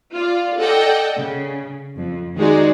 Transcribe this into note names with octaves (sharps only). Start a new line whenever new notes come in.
F4 D5
A4 D5 D#5 F#5 G5
C#3
F2
D#3 G#3 D#4 F#4 G#4 D5